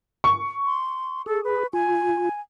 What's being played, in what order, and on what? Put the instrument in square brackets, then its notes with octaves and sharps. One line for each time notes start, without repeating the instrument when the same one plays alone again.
[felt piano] C#6
[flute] C6
[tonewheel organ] G#4 [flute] A4
[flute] B4
[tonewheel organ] F4 [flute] G#5